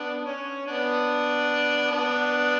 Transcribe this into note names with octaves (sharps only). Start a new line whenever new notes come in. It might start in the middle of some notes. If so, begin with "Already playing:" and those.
Already playing: B3 D4
C#4
B3 D4
B3 D4